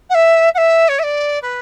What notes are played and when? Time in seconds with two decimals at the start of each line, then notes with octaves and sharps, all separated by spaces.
0.09 F#5
0.14 E5
0.54 F#5
0.57 E5
0.88 C#5
0.99 E5
1.03 D5
1.42 B4